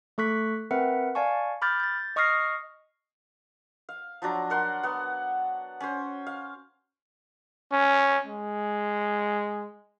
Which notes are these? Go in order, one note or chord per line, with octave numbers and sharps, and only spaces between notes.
A3 A4 C#6 F#6 B6
C4 A#4 B4 E5 F#5
D5 F5 G#5 A5 C#6
B5 D6 F6 G6 A6
G6 A6
D#5 C#6 D#6 F6 A#6 C7
F5
F3 F#3 D4 A#5
A#4 F#5 C6
B3 F#5
C#4 C5
F5
C#4
G#3